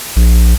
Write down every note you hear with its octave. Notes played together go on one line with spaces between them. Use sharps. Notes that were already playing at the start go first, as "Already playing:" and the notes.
A#1